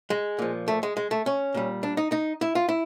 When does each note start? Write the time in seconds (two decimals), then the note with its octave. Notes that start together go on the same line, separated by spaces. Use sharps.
0.10 G#3
0.39 A#2 F3
0.68 A3
0.83 G#3
0.97 G#3
1.11 A3
1.26 C#4
1.54 A#2 G3
1.83 D4
1.97 D#4
2.12 D#4
2.41 E4
2.55 F4
2.69 E4